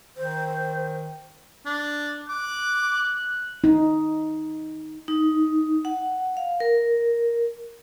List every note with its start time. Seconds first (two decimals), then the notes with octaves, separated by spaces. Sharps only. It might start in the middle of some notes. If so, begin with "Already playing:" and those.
0.17 D#3 C5
1.66 D4
2.29 D6 F#6
3.64 D#4
5.08 D#4
5.85 F#5
6.37 F5
6.60 A#4